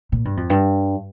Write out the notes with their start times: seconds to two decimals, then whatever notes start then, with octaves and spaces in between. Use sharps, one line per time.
0.12 A#2
0.25 G2
0.37 F2
0.50 G2